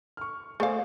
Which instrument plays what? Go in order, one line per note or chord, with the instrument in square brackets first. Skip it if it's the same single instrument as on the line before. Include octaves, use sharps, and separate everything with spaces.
[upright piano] C#6 F6
[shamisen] A3 F5 [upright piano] G#4 C5 D5